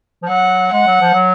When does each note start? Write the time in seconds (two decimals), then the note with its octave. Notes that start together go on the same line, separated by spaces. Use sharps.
0.23 F3
0.29 F#3 F#5
0.73 G#3 F#5
0.87 F#3
1.01 F3
1.14 F#3